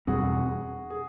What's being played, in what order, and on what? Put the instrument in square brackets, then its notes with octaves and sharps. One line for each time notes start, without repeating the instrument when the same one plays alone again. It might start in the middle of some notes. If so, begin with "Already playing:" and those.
[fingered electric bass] E2 B2 G3 C4 [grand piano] F#4 G#4
[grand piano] G#4